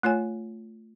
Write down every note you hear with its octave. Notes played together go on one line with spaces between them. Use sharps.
A3 F4 C#5 G#5